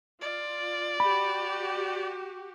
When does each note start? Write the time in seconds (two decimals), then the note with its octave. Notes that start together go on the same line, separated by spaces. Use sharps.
0.21 F4 D5
1.00 F#4 G4 B5